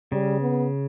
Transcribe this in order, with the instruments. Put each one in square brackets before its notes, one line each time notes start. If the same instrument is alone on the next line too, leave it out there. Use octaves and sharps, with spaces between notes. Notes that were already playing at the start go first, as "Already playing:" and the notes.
[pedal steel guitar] C#3 [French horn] G3
[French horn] B3